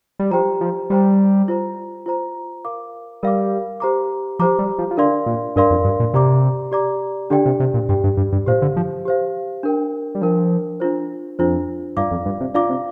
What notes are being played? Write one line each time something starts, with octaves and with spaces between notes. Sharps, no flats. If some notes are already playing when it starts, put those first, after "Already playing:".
G3
F3 G4 C5 G5 A#5
F3
G3 G4 C5 G5 A#5
F4 C5 A#5
F4 C5 A#5
A#4 F5 D6
G3 A#4 F5 D6
G4 C5 A#5 D6
F3 G4 C5 A#5 D6
G3
F3
F3
D3 D4 A#4 D5 F5 C6
A#2
G2 D4 A#4 D5 F5 C6
F2
G2
A#2
C3 G4 D5 A#5 D6
G4 D5 A#5 D6
D3 D4 G4 D5 G5
C3
C3
A#2
G2 D4 G4 D5 G5
G2
G2
G2
A#2 G4 C5 F5
D3
F3
G4 C5 F5
D4 A#4 G5
G3
F3 D4 A#4 G5
D4 F4 C5
F2 D4 F4 C5
G2 F4 D5 F5 D6
F2
G2
C3
D3 F4 D5 F5 D6
C3